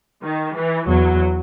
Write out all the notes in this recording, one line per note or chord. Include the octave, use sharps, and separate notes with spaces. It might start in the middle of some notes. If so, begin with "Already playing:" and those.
D#3
E3
E2 F#3